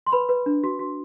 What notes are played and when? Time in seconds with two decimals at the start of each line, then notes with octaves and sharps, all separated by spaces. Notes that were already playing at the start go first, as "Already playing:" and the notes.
0.06 C6
0.12 B4 B5
0.29 B4
0.46 D4
0.64 F#4
0.79 F#4